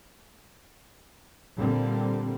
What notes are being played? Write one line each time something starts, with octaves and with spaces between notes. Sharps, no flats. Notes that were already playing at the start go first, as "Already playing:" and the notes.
A#2 D3 G3 A#3 C4